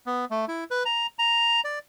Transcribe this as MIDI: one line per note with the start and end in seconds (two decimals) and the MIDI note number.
0.06 0.25 59
0.31 0.45 57
0.48 0.64 64
0.71 0.83 71
0.85 1.07 82
1.19 1.61 82
1.64 1.79 74